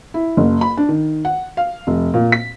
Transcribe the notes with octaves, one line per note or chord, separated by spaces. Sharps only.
E4
F#1
B5
D4
D#3
F#5
F5
F1
A#2
B6